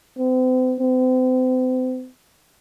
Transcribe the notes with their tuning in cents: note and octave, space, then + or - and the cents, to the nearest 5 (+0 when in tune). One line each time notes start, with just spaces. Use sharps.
C4 -40
C4 -40